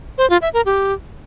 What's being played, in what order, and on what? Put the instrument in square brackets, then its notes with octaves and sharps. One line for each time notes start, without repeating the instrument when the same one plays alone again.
[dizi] C5
F4
E5
A#4
G4